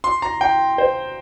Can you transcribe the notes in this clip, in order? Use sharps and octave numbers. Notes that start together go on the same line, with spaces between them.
C6
A#5
G5
C5